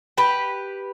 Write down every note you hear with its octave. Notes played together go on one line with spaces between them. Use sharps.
G4 B4